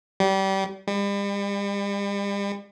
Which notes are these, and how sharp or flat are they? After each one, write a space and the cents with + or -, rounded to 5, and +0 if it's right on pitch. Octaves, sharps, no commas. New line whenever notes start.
G3 -25
G3 +40